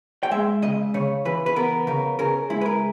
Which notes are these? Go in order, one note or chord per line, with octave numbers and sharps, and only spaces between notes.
G5
G#3 E5
C#3 D#5
C#3 C#5
E3 B4
B4
B3 A#4
C#3 A#4
C#3 A#4
G#3 E4
B4
A#4